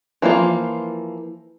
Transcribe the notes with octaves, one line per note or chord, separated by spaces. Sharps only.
E3 F3 A#3 F4